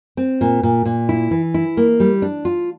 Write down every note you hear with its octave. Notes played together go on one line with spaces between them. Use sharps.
C4
A#2
A#2
A#2
E4
E3
E4
A#3
G3
D4
F4